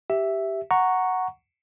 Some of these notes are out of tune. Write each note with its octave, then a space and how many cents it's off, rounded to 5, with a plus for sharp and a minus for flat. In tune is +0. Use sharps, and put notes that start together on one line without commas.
G4 -5 E5 +0
F#5 +0 A#5 +0 C#6 +0